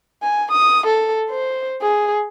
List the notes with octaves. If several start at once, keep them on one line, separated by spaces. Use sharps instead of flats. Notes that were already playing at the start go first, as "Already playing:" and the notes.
G#5
D#6
A4
C5
G#4